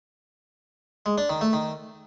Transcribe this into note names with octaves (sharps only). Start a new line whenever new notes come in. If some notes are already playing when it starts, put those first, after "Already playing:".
G#3
D4
D#3
A3
D#3